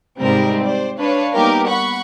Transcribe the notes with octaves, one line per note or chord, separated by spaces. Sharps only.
G#2 C3 G3 C4 A#4
C5 D5
D4 B4 C#5 F5
G3 A#3 B3 D#4 G4 A#4
F#5 B5 C#6